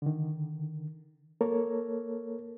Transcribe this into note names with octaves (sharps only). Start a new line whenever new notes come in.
D3 D#3
A#3 A4 A#4 C#5